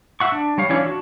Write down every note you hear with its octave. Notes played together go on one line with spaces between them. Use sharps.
E5 F#5 C#6
D4
G3 C#5 F5
E3 C#4 D4 F4 C#5
D4 F#4